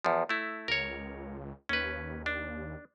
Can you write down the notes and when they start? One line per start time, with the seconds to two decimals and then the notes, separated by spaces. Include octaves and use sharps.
0.04 E2 F3
0.29 A3 E4
0.68 C#2 A#4 C#5
1.69 D#2 C#4 B4
2.26 D4